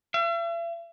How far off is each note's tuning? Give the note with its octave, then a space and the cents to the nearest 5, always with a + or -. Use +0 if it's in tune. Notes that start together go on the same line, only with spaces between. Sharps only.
E5 +45